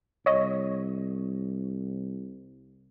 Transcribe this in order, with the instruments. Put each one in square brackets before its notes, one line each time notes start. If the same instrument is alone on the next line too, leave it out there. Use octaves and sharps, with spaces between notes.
[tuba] C2 [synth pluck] C#5 D#5